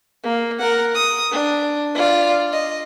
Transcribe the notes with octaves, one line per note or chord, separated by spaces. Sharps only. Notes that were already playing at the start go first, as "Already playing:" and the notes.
A#3
A#4 F#5
D#6
D4
F4 D5
D#5